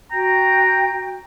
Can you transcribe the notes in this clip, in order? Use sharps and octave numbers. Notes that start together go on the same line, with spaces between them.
F#4 G5 A#5 G6